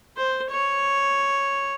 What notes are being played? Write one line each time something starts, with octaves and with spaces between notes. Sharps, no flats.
C5
C#5